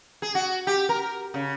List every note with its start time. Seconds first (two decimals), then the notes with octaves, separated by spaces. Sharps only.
0.22 G#4
0.35 F#4
0.67 G4
0.89 A#4
1.34 C#3